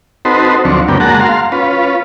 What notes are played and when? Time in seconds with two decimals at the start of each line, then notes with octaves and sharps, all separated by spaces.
0.25 C4 D#4 F#4 A4 B4 C5
0.65 D2 F3 F#3 C4 D4 C#6
0.88 F#2 C#3 A#3 B3 D4 G5
1.00 G#3 A#3 F#4 F#5 A5 A#5
1.20 F5 C6
1.52 C#4 F4 B4